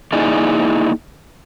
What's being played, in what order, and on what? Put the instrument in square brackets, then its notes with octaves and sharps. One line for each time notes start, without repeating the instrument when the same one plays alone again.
[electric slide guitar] A#3 D#4 E4 G#4 D5 D#5